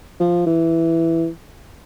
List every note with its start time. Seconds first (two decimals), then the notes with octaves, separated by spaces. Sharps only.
0.20 F3
0.46 E3